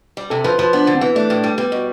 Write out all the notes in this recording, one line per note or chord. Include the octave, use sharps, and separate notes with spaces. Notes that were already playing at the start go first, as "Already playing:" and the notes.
G3
C3 A4
F3 B4
F3 B4
B3 D4
D3
C4
E3 B3
A3 D4
A2
G3
G3 B3
B2